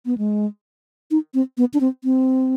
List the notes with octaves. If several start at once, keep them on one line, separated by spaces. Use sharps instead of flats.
B3
G#3
D#4
C4
B3
D4
C4
C4